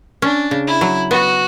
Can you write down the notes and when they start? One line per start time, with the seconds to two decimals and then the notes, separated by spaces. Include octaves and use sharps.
0.22 C#4 D4
0.51 C#3
0.67 E4
0.81 F#3
1.11 B3 F#4